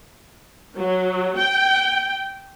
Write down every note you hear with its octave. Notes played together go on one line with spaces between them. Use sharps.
F#3
G5